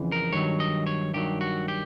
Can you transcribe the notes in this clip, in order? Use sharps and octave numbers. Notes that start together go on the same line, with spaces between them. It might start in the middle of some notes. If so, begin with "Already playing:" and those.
Already playing: F2 C#3 E3
A#4
G2 D#3 F#3 C#5
D#5
C#5
G2 D#3 F#3 G4
F#4
G4